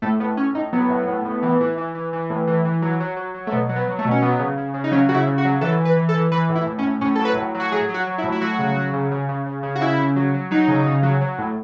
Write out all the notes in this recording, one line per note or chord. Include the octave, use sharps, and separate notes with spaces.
A2 A3
A2 B3
A2 C#4
A2 D#4
F#3 B3
A2
A2
A2
E3
E3
E3
E3
E3
A2
E3
E3
F#3
F#3
F#3
F#3
A3
B2 B3
F#3
B3
F#3
A3
B2
C#4
F#3 B3
C#3
C#3
C#3
D#4
F#3 C#4
C#3 F#4
E4
C#3
F#4
F#3
E3 A4
E3
B4
E3
A4
E3
E3 B4
A2
E4
A2
C#4
A2
A2 C#4
A4
F#3
B4
A2
F#3
F#4
F#3 G#4
F#3
F#4
F#3
E4
A2
E4
F#3 F#4
C#3
F#3
C#3
C#3
C#3
C#3
C#3
F#4
C#3 E4
C#3
F#3
F#3
F#3 D#4
C#3
C#3
F#3
F#3
A2